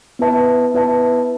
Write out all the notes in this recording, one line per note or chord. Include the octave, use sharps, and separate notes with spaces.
B3 E4 B4 E5 A5
B3 E4 B4 E5 A5